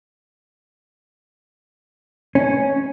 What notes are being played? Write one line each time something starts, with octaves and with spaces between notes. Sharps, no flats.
C#4